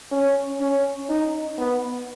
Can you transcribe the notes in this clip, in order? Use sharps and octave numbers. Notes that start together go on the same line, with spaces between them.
C#4
C#4
D#4
B3